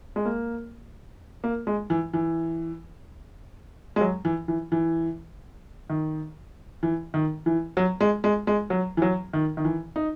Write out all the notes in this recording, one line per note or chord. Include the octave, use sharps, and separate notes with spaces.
G#3
A#3
A#3
G#3
E3
E3
G#3
F#3
E3
E3
E3
D#3
E3
D#3
E3
F#3
G#3
G#3
G#3
F#3
E3
F#3
D#3
D#3
E3
D#4